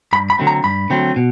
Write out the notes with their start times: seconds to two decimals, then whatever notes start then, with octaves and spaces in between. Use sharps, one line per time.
0.13 G2 B5
0.30 B5
0.38 D3 F#3 A3 C4
0.47 A#5
0.64 G2 B5
0.90 D3 F#3 A3 C4
1.16 B2